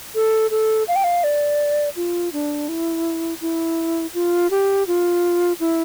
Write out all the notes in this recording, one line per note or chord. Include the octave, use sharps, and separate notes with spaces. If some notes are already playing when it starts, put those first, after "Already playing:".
A4
A4
F5
G5
F5
D5
F4
D4
E4
E4
F4
G4
F4
E4